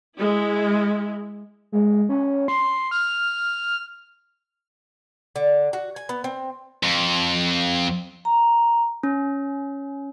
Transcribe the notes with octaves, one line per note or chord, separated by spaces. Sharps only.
G#3 E4
G#3
C#4
C6
F6
D3
F#4
G#5
B3
C4
F2
A#5
C#4